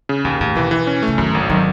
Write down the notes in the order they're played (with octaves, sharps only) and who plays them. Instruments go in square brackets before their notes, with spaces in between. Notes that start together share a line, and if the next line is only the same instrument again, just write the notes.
[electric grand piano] C#3
[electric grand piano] D#2 [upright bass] B2
[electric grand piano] D#2 [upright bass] A2
[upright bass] B2 [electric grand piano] E3
[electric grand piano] E3
C#4
[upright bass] C#3 [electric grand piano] A3
[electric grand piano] F#2 [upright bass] D#3
[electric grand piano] G#1
[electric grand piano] D#3 [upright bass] F#3